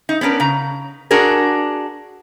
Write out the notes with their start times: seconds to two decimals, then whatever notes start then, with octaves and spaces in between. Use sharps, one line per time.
0.09 D#4
0.21 B3 C#4 D4 A#4 B4
0.40 C#3 A#5
1.11 D4 F#4 G#4 A#4